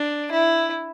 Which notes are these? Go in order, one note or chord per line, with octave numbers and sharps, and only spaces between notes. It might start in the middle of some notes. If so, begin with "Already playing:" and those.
Already playing: D4
E4